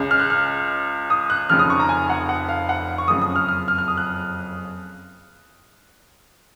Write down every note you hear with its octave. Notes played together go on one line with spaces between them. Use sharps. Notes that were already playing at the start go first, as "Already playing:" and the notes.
Already playing: C#2 C#3 G#3
F6
F#6
F6
D#6
F#6
F1 F2 C#3 F6
D#6
C#6
A#5
G#5
F#5
F#5
F5
F#5
C#6
F#1 F2 C#3 D#6
D#6
F6
F6
F6
F6
D#6
F#6